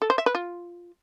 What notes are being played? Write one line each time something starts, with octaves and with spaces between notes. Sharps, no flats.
A4
C5
E5
B4
F4